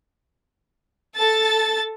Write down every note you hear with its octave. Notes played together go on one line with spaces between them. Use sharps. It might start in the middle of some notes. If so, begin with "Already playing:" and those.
A4 A6